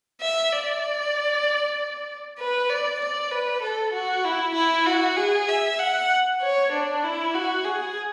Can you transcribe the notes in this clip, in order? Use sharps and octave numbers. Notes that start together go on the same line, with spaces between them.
E5
D5
B4
D5
D5
B4
A4
F#4
E4
E4
F#4
G#4
E5
F#5
C#5
D4
E4
F#4
G#4